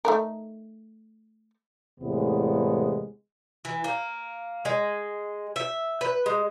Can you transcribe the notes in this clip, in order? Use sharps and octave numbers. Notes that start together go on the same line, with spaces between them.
A3 D#4 A#4
E2 A2 C3 G#3 A#3 B3
E3
A#3
G#3
E5
B4
G#3